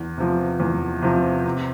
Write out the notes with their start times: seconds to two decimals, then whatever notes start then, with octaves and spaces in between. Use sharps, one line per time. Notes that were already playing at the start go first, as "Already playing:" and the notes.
Already playing: E2
0.18 C3 F3
0.60 E2
1.02 C3 F3
1.44 C3